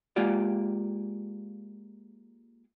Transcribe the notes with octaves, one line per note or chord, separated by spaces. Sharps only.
G#3 A#3 F4 G4 D5